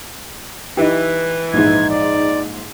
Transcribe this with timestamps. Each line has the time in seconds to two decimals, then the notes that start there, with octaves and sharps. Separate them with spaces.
0.77 E3 D#4 E4 G4
1.54 A#1 G#2 D#4 G#6
1.90 D5